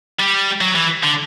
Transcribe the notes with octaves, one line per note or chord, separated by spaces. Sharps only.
G3
F#3
E3
D3